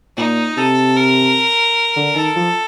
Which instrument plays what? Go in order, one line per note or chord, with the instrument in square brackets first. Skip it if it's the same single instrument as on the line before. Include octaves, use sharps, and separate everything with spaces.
[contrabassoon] A#2 [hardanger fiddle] D#4
[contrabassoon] C3 [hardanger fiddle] A4
[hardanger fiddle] A#4
[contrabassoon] D3
[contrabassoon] D#3 [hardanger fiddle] A4
[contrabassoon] F3